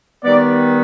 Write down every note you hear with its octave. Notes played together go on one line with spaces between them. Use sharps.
D#3 G3 B3 D5